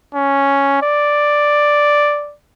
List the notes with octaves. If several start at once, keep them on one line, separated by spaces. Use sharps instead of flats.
C#4
D5